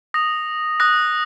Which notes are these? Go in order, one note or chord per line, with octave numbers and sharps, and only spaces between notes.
D#6 A#6 F7
D#6 F#6 A#6